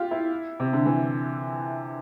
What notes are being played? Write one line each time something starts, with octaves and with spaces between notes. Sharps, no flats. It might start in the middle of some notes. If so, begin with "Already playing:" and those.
Already playing: F4 G4
E4
C3
D3
E3